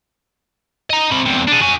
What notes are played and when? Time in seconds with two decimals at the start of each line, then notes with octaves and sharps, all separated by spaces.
0.90 D#5 A#5
1.12 C3 B5
1.26 E2 C3
1.47 D4 G#4
1.61 F#4 G#5